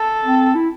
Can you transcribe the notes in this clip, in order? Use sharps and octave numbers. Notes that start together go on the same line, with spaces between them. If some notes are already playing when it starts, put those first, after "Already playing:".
Already playing: A4
C4
E4